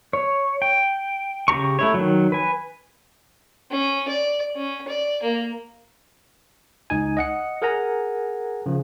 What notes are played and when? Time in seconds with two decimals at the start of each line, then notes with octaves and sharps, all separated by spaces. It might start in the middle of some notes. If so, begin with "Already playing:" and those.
0.13 C#5
0.62 G5
1.48 C#3 G4 A#5 C#6
1.79 A3 E4 C#5
1.94 D#3 F#3
2.32 B4 G#5
3.71 C#4
4.08 D5
4.56 C#4
4.88 D5
5.22 A#3
6.90 C#2 D#4 G#5
7.17 D#5 F#5 C#7
7.62 G#4 A#4 F#5 G#5 A#5
8.66 C#3 F3